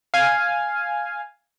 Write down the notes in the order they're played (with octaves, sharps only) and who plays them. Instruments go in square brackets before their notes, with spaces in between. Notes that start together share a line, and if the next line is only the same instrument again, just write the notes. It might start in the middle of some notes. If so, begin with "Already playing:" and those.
[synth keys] F5 G#5